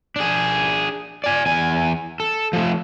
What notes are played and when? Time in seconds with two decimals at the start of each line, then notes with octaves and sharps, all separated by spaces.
0.16 D4 G#4
1.24 D5 G#5
1.46 E2 G#5
2.20 A4
2.53 F3 A3